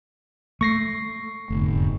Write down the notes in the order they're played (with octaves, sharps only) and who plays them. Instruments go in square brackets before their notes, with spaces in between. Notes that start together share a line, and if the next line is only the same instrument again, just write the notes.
[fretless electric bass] A3 [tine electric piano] C#6 A#6 C7
[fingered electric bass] F1 [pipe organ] E2 G#2 D3